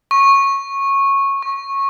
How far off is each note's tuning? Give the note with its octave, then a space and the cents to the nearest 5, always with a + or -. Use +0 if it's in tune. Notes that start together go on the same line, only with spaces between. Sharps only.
C#6 -15
C#6 -20